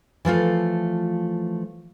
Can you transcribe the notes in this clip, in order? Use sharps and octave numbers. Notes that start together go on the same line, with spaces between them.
E3 F3 A3 F4